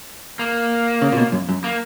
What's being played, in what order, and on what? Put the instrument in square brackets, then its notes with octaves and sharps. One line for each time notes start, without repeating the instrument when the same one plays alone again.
[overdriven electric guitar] A#3
[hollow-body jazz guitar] C#3
A#2
B2
F#2
F#2
[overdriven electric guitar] A#3